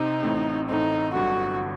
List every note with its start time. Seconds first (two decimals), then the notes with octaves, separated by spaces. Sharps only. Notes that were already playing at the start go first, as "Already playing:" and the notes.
Already playing: C3 D#4 C5
0.23 A1 A2 A3 C4
0.69 A1 A2 A3 C4 D#4
1.14 G1 G2 D3 F#3 F#4